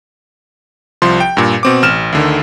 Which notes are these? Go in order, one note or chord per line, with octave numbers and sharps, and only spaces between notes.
C2 F3 C6
G5
G2 A#2
B2 C4 D6
A1 F6 E7
D2 D3 D#3